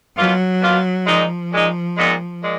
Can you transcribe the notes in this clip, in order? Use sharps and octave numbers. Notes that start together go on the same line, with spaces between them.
B2 F#3 A#3 F4
B2 A#3 F4
A#2 F3 G#3 D#4
A#2 G#3 D#4
A#2 G#3 B3 D#4
A#2 G#3